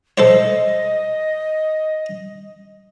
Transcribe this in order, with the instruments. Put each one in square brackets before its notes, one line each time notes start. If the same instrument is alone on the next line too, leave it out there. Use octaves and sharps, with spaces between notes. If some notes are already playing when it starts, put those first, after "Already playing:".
[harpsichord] A4 C5 C#5 [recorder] D#5